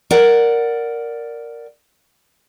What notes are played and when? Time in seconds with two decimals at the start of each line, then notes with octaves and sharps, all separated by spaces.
0.11 A#4 D5 F#5